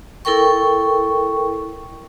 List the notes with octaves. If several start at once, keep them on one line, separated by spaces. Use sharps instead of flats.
E4 A4 A#4 G5 C#6